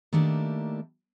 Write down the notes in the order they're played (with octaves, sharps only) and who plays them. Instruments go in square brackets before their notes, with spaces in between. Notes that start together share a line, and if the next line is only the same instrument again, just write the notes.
[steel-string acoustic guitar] D#3 A3 A#3 D4 E4 G4